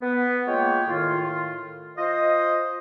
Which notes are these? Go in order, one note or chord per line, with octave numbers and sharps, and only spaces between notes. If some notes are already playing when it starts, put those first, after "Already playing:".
B3
G#3 A#3 F4 C#5 G5
A2 D#3 F4
F4 C5 D#5